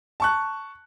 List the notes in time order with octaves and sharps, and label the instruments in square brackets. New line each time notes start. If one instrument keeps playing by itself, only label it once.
[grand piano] A5 C#6 F#6